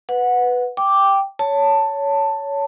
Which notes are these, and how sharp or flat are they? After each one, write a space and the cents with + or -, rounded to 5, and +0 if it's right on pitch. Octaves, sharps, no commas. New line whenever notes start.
B4 +5 F#5 -15
G5 +0 D6 +0
C#5 +15 A5 +10